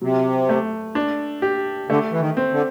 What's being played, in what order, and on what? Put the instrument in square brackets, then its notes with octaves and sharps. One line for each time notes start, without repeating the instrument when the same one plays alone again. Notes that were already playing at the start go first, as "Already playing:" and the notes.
[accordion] C3 [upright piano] F#3
[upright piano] A3
D4
G4
[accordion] D3 [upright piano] A3
[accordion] E3
D#3
[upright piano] C4
[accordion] D3